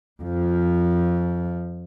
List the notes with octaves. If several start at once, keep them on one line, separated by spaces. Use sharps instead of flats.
F2 F3